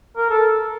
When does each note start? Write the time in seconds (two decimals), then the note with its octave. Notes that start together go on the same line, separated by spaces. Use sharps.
0.16 A#4
0.30 A4